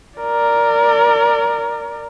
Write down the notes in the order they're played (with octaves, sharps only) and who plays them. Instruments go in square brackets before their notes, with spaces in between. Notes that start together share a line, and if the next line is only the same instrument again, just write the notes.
[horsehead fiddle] A#4 D5